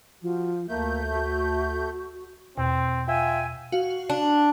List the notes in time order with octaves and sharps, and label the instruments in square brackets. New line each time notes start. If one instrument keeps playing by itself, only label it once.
[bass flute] F3 [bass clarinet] F#4
[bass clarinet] D2 [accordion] A3 G6 [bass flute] A#3
[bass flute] F#4
[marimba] E2 B2 [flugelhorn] C4
[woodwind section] F4 G5 G#5 [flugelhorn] E5
[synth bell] F#4 F5
[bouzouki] D4